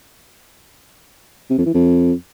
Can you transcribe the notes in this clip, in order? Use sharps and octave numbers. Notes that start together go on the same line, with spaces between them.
C3
F2
E3
F2